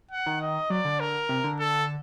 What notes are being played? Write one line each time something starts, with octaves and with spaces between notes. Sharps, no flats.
F#5
D#3
D#5
F#3 D5
D3
A#4
C3
D3
A4